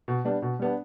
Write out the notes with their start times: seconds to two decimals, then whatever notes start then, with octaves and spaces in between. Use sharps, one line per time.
0.08 B2
0.25 G3 B3 D4
0.42 B2
0.59 G3 B3 D4